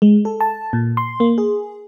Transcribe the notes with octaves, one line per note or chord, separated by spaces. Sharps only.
G#3
A4
A5
A#2
C6
A#3
G#4